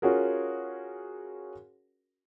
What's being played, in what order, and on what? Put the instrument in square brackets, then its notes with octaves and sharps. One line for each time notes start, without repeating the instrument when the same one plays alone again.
[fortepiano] C#4 F4 F#4 G#4 A#4